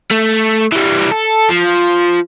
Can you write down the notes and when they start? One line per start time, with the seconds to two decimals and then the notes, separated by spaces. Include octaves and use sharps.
0.11 A3
0.72 E3 G3
1.12 A4
1.50 F3